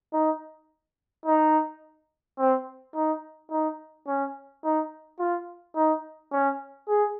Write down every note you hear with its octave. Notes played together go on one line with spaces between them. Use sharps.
D#4
D#4
C4
D#4
D#4
C#4
D#4
F4
D#4
C#4
G#4